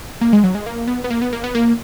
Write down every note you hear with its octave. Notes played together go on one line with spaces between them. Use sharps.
A#3
G#3
F#3
G#3
A#3
B3
B3
A#3
B3
A#3
B3
A#3